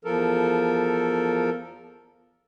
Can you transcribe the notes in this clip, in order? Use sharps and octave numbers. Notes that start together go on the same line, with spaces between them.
E2 F3 A4 A#4